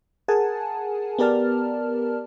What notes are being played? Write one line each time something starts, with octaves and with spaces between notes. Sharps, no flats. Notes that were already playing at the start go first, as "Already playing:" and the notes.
G#4 A#4 F#5 G#5 A5
B3 G4 A#4 D5 A5 F6